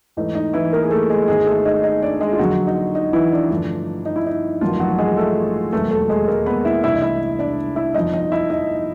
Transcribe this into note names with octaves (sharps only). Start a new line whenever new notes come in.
G#2 E3 A3 D#4
D#4
E3 E4
A#3 A#4
G#4
A3 A4
G#3 G#4
G#1 G#2 D#3 G#3 B3 G#4
A3 A4
D#4 D#5
D#4 D#5
D4 D5
G#3 G#4
F4
F2 D3 F3 F#3 A#3 F#4
D#4
D#4
E3 E4
D4
G2 D3 F3 A3
D#4
E4
D#4
A1 G2 D#3 F3 F#3 A#3 F4
F#3 F#4
G#3 G#4
A3 A4
E1 D#2 D#3 F#3 A3 B3 A4
A3 A4
G#3 G#4
A#3 A#4
B3 B4
E4 E5
C2 C3 E3 A3 D4 E4 E5
D#5
E4 E5
D4 D5
E4 E5
G1 F2 D3 F3 D#4 D#5
D#4 D#5
E4 E5
D#4 D#5